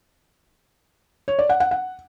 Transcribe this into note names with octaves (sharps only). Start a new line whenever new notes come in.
C#5
D5
F#5
F#5
F#5